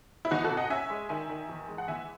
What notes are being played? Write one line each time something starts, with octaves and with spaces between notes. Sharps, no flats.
E4
E3 D#4 F#4
F#4 A4
C3
D#5 F#5
C#4 E5 G#5
G#3
D#3 E5 G#5
D#3
E2
G#3
F#5
E3 E5 G#5